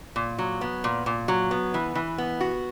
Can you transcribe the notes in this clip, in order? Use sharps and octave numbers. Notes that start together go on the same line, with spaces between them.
A#2
F#3
B3
A#2
A#2
F#3
B3
E3
E3
B3
F#4